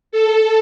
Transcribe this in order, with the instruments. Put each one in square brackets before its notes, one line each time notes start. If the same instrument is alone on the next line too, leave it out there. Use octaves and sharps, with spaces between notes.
[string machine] A4